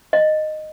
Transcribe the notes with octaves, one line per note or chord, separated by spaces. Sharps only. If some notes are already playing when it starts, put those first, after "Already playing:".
D#5